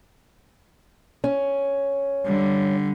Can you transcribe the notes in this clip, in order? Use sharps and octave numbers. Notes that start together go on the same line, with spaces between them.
C#4
D3 G3